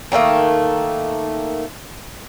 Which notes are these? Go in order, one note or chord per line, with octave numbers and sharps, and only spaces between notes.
D#3 G3 A3 A#3